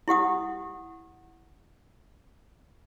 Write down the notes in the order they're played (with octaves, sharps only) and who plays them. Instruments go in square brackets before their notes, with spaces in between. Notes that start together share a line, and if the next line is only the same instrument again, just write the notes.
[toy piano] E4 G4 F#5 D#6